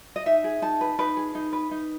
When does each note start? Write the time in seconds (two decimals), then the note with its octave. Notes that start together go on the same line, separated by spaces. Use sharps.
0.16 D#5
0.26 D#4 E5
0.44 G#4
0.62 D#4 A5
0.81 B4
0.99 D#4 B4
1.17 G#4
1.35 D#4
1.53 B4
1.71 D#4